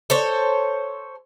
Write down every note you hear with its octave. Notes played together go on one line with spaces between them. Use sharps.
A4 C5 C#5